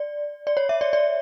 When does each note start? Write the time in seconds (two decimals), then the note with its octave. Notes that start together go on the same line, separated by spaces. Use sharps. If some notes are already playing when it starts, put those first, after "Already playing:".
Already playing: D5
0.47 D5
0.57 C#5
0.69 E5
0.81 D5
0.93 D5